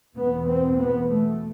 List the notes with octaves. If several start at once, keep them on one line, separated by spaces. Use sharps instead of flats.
E2 B2 B3
C4
B3
A3